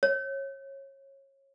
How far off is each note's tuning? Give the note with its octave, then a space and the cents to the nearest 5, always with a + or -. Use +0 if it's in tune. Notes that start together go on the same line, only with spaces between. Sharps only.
C#5 -25